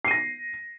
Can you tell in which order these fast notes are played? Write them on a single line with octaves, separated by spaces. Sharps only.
C7 D#7 A#6